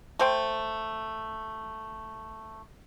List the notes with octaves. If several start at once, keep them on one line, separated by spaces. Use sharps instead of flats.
A3 C5 G5